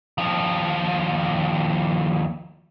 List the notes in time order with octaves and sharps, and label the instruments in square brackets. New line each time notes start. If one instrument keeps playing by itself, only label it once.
[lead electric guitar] D#2 F3